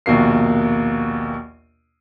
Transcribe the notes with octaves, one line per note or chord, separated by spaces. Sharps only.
A#1 D#2 B2 A#3 C7